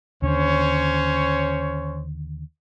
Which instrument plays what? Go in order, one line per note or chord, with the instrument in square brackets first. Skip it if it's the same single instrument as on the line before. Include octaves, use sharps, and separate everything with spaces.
[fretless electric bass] D#2 D3 [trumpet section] C#4 C5 C#5